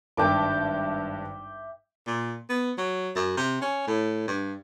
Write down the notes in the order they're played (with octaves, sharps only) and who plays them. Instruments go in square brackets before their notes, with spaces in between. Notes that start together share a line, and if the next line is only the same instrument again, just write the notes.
[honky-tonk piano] G#1 G2 A5 [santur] E5 G5 D6
[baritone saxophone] A#2
B3
F#3
F#2
C3
C#4
A2
G2